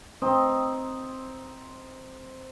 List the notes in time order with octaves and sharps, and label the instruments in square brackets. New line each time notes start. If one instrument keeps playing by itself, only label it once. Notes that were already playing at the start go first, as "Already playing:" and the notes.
[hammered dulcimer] C4 D#4 D#5